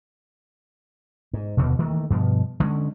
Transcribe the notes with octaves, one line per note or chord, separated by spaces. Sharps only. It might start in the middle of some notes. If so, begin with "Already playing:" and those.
G#2
F1 D#2 B2 D3
D#3 E3 A3 A#3
G2 B2 F3
D3 G#3 A#3 C#4